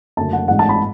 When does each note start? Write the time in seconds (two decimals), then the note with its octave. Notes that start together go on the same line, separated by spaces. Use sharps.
0.17 F#1 F#2 D3 A3 A5
0.33 F#5
0.48 A1 G#2 G#3 F#5
0.59 A5
0.69 B5